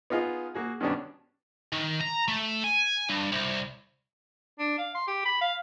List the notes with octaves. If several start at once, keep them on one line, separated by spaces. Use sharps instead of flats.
B3 D#4 F4 G#4
A#3 F#4 G#4
G2 B2 D#3 B3 C#4 D4
D#3
A#5
A3
G#5
G2
C2
D4
F5
C6
G4
B5
F5